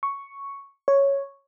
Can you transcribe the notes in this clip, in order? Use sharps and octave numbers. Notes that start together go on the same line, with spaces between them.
C#6
C#5